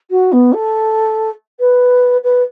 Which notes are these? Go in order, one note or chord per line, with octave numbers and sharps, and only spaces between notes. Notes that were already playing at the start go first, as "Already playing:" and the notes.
F#4
B3
A4
B4
B4